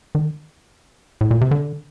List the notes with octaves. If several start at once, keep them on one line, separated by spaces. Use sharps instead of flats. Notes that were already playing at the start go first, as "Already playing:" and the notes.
D#3
A2
A#2
C3
D3